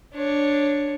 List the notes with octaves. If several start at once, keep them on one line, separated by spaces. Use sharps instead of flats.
D4 C#5